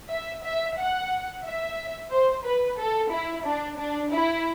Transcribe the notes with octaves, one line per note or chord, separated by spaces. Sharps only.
E5
E5
F#5
E5
C5
B4
A4
E4
D4
D4
E4